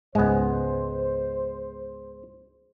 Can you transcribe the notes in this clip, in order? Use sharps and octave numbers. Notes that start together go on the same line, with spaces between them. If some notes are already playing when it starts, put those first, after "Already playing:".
C#2 G#2 G#3 B3 C5